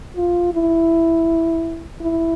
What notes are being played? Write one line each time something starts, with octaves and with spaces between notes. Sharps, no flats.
F4
E4
E4